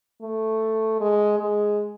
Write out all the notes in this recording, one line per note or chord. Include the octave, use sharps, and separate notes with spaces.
A3
G#3
G#3